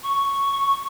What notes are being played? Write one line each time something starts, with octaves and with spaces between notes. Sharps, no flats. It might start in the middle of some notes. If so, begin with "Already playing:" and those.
C#6